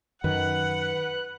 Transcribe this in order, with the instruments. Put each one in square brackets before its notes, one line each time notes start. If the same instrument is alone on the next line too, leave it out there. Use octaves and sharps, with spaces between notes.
[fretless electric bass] F#2 D#3 [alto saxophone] B4 [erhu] F#5 [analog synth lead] F#6